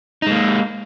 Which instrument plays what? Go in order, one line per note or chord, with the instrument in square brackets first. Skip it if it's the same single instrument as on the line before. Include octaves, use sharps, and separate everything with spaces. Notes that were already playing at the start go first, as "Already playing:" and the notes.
[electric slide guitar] D#4
G#3
A#3